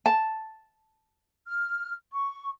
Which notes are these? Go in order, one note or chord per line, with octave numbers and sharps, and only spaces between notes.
A5
F6
C#6